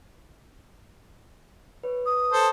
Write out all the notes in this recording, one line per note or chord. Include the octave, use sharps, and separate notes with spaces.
B4 C#5
D#6
A4 C5